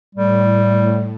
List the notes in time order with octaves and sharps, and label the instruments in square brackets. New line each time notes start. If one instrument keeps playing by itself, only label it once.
[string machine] A2 [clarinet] G3